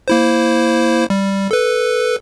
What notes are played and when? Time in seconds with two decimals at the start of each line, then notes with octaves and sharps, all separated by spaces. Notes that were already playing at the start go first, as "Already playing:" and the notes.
0.08 A#3 E4 C5
1.10 G3
1.51 A4 B4